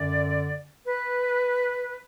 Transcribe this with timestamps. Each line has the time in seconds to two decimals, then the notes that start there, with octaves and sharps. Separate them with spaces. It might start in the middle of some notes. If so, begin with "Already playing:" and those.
Already playing: F#2 D3 D5
0.86 B4